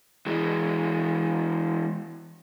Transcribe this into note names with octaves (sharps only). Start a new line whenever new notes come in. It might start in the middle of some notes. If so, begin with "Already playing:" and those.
E3 G#3